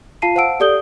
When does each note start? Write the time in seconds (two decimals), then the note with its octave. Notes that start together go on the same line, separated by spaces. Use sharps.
0.22 F4 F5 A5 C7 D#7
0.36 C5 F5 F#5 A5 E6 D7
0.60 G4 A4 D5 D#6 G6 G7